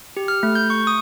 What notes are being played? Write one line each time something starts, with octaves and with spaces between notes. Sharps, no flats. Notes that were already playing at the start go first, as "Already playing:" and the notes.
G4
F6
A3
G6
C#6
D#6